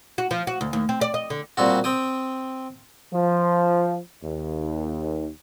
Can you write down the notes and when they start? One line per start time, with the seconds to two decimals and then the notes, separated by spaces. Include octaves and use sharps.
0.18 F#4
0.31 F3
0.47 F#4
0.61 D2
0.73 D#2
0.89 C4
1.01 D5
1.14 D#5
1.30 D3
1.57 A#2 G3 C4 F#4
1.84 C4 G5 D#6
3.14 F3
4.25 D#2